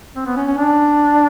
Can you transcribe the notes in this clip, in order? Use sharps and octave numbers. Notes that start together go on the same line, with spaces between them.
C4
B3
C#4
C#4
D4